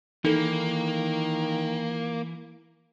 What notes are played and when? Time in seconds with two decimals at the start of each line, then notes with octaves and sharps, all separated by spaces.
0.25 D#3 E3 A#3 D#4 A4